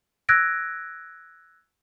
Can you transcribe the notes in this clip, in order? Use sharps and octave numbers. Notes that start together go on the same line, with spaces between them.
E6 F#6 G#6 A#6 D7